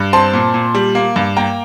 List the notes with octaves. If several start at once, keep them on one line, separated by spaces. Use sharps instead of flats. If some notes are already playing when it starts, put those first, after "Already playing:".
Already playing: G2
C4 A5 C6
A#2
A#2
G3
A#3
G2
A#3 G5 A#5